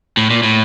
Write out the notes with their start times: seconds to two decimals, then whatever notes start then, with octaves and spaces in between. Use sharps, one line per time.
0.17 A2
0.30 A#2
0.43 A2